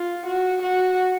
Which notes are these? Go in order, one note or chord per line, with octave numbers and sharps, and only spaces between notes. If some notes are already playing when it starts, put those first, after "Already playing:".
Already playing: F4
F#4
F#4